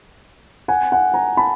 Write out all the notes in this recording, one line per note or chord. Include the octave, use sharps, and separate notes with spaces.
F#5 G#5
F#5 G#5
G#5 A#5
A5 B5